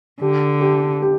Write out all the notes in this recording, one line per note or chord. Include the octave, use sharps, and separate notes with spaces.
D3 G4
G4
G4